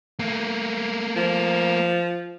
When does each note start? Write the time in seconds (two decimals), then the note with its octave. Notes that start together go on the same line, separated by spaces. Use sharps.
0.19 A3 A#3
1.16 F3